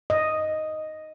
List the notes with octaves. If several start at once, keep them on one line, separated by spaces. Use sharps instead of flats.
D#5